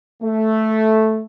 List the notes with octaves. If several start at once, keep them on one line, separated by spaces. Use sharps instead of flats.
A3